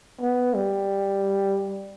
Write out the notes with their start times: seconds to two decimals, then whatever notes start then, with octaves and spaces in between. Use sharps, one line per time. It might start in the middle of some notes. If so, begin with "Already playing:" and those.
0.21 B3
0.54 G3